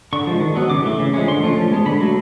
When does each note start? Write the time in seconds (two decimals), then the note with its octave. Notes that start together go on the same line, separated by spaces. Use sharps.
0.13 D3 C#6
0.27 F3 G#3
0.40 D#3
0.55 F#3 B3
0.69 C#3 D6
0.84 E3 A3
1.00 C#3
1.14 F3 G#3 C#4
1.27 D3 C6
1.43 F3 A3 C#4
1.57 F3
1.71 G#3 B3
1.86 D3 B5
2.01 F#3 A3